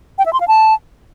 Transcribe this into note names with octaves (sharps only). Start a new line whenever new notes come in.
G5
E5
C6
F5
A5